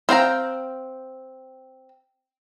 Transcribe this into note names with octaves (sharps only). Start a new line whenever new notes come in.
C4 F5 G5 A#5